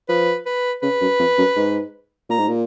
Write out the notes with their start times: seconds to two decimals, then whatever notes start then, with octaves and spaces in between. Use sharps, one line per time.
0.09 F3 B4
0.46 B4
0.82 C#3 B4
1.01 F#2
1.19 F2
1.38 F#2
1.56 G#2
2.29 A#2 A#5
2.38 G#2
2.48 A#2